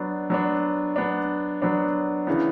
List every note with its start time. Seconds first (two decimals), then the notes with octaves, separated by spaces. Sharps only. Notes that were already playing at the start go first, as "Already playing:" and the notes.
Already playing: F#3 B3 D4
0.30 F#3 B3 D4
0.96 F#3 B3 D4
1.62 F#3 B3 D4
2.27 C#3 E3 B3